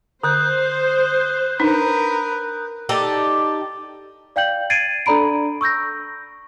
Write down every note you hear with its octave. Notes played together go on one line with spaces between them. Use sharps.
D3 C5 D#6 F#6 G6
D4 D#4 A#4 B4
D#4 G4 A4 D5
D5 F5 G5 G6 F#7
G#6 A6 C7 D7 D#7
D4 A4 D5 A#5 B5 D7
C#6 E6 G6 A#6